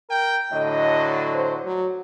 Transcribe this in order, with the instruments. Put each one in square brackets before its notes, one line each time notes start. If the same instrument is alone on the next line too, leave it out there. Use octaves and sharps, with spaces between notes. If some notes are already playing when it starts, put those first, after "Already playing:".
[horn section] A#4 G5
[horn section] A2 D3 F#3 [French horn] D#5
[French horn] C5
F#3